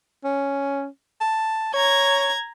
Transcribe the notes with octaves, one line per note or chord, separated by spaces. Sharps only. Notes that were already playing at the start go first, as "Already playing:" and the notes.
C#4
A5
C#5 A#5 G#6